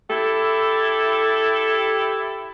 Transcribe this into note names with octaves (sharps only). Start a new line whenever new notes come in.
E4 G4 A4